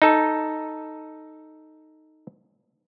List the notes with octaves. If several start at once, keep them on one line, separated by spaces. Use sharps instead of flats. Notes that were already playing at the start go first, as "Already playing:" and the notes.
D#4 A4